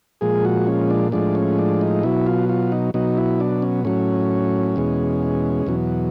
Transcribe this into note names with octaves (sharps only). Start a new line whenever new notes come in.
A#2 F3 G#3 G#4
F#4
C#4
D4
A2 F3 G#3 D4
C#4
D4
D#4
B2 F#3 E4
F4
F4
D#4
B2 F#3 D#4
E4
D4
C#4
A2 F#3 C#4
E2 B2 G#3
E2 B2 F#3